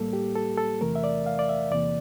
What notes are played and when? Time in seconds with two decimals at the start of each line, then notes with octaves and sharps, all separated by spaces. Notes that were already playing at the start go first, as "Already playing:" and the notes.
Already playing: A2 G3 A#3 A4
0.13 G4
0.35 A4
0.58 A4
0.81 E2 C3 E3 A3 A#4
0.95 E5
1.04 D5
1.26 F5
1.39 D5
1.49 E5
1.71 E2 C3 E3 A#3 D5